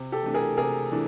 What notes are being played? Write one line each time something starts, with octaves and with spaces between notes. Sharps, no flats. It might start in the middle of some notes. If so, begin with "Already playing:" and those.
Already playing: C3
G4 A4
E3 A3 D4
G#4 A#4
C3 G#4 A#4
E3 A3 D4